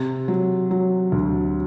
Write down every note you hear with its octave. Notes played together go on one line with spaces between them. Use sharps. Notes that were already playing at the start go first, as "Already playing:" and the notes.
Already playing: C3
F#3
F#3
D2